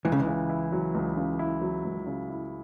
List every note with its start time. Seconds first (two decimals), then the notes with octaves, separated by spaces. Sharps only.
0.05 C#2 E3
0.12 C#3
0.20 E3
0.27 C#3
0.49 E4
0.72 F#3
0.95 C#2
1.17 C#3
1.39 E4
1.62 F#3
1.85 C#2
2.07 C#3
2.29 E4